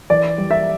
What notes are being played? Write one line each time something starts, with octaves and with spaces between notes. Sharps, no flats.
E3 D5
G3
E5